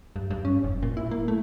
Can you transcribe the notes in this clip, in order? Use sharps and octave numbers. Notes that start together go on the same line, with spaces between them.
G2
G2
C#4
F1
A#2
E4
A#3
A3